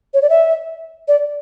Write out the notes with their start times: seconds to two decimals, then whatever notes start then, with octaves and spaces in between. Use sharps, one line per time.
0.14 C#5
0.22 D5
0.30 E5
1.08 D5